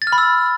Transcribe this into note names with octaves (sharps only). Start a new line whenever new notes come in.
A6
F6
B5
E6